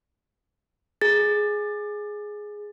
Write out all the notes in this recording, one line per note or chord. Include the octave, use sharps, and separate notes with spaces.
G#4 A6